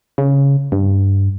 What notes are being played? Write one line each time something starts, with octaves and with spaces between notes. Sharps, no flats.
C#3
G2